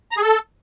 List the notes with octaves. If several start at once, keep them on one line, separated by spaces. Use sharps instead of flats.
A#5
G#4
A4